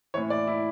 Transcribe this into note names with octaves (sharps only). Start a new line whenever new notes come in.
A2 E3 C#5
D5
E4